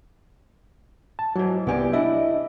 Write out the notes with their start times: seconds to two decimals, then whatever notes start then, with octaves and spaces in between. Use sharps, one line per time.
1.19 A5
1.36 G#2 E3 F#3
1.67 C2 B3 E4 G4 D5 G#5
1.93 D4 E4 D#5 E5